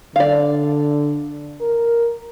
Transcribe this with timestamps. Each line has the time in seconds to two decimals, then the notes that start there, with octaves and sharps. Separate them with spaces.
0.16 D3 D5 F5
1.61 A#4